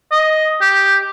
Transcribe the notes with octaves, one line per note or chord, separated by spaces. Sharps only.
D#5
G4